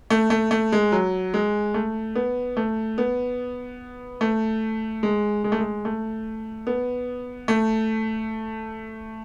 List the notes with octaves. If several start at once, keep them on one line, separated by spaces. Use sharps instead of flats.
A3
A3
A3
G#3
F#3
G#3
A3
B3
A3
B3
A3
G#3
G#3
A3
G#3
A3
B3
A3